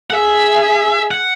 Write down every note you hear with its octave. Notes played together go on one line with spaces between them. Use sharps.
F#5
G#4 E5
F#5